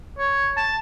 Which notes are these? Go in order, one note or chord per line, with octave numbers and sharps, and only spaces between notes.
C#5
A5